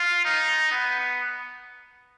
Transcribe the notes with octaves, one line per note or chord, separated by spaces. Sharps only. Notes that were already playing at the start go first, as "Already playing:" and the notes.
Already playing: F4
D#4
B3